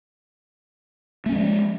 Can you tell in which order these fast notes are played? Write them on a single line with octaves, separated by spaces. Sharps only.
A3 C#4 G#3 F3